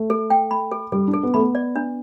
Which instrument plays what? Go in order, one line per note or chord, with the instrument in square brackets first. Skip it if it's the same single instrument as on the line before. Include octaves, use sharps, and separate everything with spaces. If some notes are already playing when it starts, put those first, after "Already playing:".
Already playing: [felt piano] A3
[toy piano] A4
G5
B5
A4
[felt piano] G3 [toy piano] A4
[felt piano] D4
[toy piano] A4
[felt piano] B3
[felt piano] A3 [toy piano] B5
[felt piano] B3
[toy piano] D5
D4